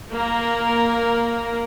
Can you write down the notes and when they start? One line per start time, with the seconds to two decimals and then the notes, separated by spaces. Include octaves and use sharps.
0.13 A#3 A#4